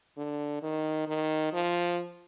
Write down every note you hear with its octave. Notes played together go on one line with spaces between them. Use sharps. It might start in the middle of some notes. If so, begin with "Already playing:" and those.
D3
D#3
D#3
F3